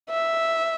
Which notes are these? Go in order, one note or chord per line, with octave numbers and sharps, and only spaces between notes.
E5